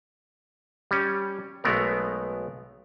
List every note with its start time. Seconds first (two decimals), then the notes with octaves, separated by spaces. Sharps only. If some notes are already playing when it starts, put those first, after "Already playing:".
0.91 G3 C#4
1.64 B1 G#3 A3 B3 A#4